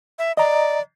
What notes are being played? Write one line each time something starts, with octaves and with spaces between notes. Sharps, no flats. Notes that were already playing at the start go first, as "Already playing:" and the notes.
E5
D5 D#5 A#5